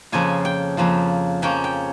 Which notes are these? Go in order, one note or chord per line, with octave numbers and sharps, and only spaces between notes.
F2 C#3 F3 A#3 F4 G#5
G5
F2 C#3 F3 A#3 F4
C#3 F3 A#3 C#4 F4 G5
G5